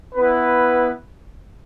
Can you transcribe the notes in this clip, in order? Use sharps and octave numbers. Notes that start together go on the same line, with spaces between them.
B3 E4 B4